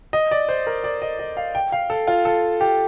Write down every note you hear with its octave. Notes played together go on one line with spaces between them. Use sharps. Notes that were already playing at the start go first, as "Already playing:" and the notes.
D#5
D5
C5
A#4
D5
D#5
D#5
F5
G5
F5
A4
F4
A4
G4